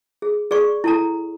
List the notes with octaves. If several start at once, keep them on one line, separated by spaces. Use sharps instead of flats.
G#4
G#4 D5 C#6
E4 A4 A#5